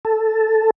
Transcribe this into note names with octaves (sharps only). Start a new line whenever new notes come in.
A4